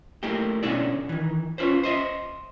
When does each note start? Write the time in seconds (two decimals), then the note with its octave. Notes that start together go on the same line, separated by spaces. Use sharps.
0.23 A3 A#3 E4 G4
0.63 B2 D3 C#4 E4 D5
1.09 D#3 E3
1.58 C#4 F4 B4 C5
1.83 C5 D#5 E5